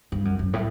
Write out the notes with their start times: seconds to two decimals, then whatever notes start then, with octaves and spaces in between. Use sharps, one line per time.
0.12 G2
0.25 F#2
0.39 F#2
0.53 A2